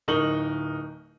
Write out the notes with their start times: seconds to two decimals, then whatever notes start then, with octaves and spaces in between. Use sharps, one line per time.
0.08 D1 D#4 A#4 C#6 F#7 G7